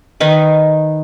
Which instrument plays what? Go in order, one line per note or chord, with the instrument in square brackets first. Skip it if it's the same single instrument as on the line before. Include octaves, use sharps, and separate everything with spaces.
[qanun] D#3 D#4 A#4 B4